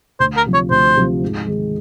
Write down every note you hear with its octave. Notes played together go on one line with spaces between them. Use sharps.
D2 C5
A#4
C3 F3
C#5
D2 C5
C3 F3
G#2
D#3 G#3